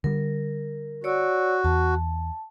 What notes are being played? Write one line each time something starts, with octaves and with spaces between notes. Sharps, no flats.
D3 G3 A#4
F#4 C#5 D5 E6
E2 A5